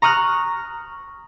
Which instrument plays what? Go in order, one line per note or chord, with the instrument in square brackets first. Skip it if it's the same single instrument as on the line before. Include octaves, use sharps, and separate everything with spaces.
[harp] A#5 C#6 D#6 F6 F#6